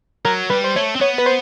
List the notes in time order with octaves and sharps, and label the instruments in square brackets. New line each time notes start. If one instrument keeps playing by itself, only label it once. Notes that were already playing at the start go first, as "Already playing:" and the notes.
[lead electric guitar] F#3 [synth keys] A#4
[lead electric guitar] G3 [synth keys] B4
[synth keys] C5
[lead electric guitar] A3 [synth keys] C#5
[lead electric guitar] C4
[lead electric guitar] B3 [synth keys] C#5
[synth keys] B4
C5